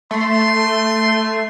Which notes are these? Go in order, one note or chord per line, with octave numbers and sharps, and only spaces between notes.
A3 C6